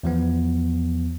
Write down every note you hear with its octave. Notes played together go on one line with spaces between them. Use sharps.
E2 F3 B3